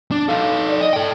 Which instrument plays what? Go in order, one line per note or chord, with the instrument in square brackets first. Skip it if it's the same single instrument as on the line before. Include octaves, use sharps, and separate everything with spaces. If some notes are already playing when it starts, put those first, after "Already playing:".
[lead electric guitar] D4
[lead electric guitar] D#4 A4 [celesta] F5
[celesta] D5
[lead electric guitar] D#5
A4 G5